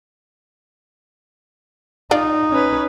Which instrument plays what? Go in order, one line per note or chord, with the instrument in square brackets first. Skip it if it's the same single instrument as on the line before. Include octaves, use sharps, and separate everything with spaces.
[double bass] D#4 [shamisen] F4 D5
[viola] C#4 B4